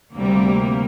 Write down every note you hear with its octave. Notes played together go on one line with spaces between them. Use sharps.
D2 C3 G3 A#3